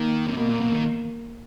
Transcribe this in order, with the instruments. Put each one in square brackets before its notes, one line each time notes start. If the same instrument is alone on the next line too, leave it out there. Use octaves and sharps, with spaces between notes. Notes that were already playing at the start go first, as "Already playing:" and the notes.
Already playing: [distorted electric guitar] D#3 [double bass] A#3
[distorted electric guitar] C3
[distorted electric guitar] B2 [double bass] A#3
[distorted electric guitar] A#2
B2
D#3